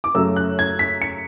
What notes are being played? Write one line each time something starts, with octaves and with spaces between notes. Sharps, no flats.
D6
F#2 C#3 F#3 A3 E6
F#6
G#6
B6
C#7